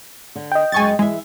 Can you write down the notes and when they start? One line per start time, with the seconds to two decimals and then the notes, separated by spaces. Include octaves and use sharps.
0.36 D3
0.52 D#5 G5
0.72 F#2 G#3 G#5 C#6 A6
0.99 E3 G#3 E5